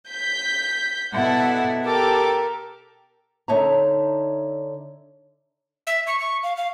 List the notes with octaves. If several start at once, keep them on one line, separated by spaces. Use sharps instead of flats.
G6 B6
B2 E4 A4 D5 E5 F#5
G4 A4 A#4 D6
D3 D#4 C#5 E5 A5 A#5
E5
C#6
C#6
F5
F5